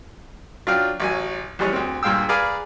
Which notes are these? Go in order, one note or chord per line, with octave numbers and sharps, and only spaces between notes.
F#3 D4 F4 F5 G5 F6
A1 F#3 G#5
A#1 E3 G3 G#4 C#5
D2 C4
G2 A#2 G#3 F5 G5 E6
G#4 B4 D5 F5 G#5 A#5